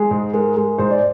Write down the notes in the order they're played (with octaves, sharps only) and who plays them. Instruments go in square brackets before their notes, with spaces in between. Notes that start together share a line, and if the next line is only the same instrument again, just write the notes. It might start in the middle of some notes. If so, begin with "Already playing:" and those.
Already playing: [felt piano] G#3 [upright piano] G#4
[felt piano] G#2
[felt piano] G#3 [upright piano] A#4
[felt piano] G#3
[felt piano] G#2 [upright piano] C5
[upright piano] D5